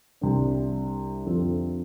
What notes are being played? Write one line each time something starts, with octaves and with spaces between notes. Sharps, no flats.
C2 C3 G3 D4
F2 D3 F3 C4